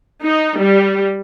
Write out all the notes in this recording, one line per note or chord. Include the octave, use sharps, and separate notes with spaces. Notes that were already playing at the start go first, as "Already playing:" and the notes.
D#4
G3